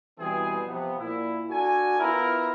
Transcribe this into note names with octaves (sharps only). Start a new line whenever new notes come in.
B2 E3 G3 C4 G#4
C3 F3 B3
A#2 E4
D4 F#4 A4 G#5
B3 E4 F4 A#4 A#5